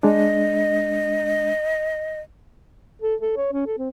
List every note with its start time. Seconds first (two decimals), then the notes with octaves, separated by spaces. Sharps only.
0.03 G#3 D4 D#5
3.02 A4
3.21 A4
3.36 C#5
3.53 C#4
3.67 A4
3.78 C4